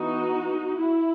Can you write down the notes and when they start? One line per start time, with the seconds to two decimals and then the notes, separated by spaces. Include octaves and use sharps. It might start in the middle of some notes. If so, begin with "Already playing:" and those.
Already playing: E3 B3 D#4 F#4
0.78 E4